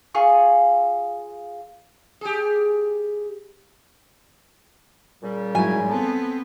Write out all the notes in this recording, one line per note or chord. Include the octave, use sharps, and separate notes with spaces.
F4 G#4 C#6
G4 G#4
A#2 C#3 G3
G#2 F#3 E4 G#5
B3 C4 A4